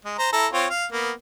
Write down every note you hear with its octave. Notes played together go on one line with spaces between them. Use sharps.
G#3
C5 A#5
E4 A4 A#5
C4 F4 C#5
F5
A#3 B3